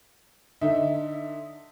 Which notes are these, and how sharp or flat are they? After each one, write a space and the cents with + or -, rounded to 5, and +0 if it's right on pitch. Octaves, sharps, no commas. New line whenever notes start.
D3 +20 D#4 +0 E5 +0